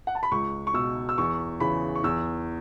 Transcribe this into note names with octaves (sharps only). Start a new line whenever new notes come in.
F#5
A5
B5
C#2 C#6
C#6
B2 E6
E6
E2 C#6
C#3 E3 B5
C#6
E2 E6